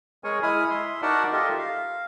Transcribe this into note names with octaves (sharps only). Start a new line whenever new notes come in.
G#3 G#4 A#4 C#5 G#5 C#6
G#3 E4 G#5 B5 D#6 F6
E5 C6
D#4 F#4 A#4 D5 F#5 A5
F4 G4 A4 A#4 D#5 E5
F5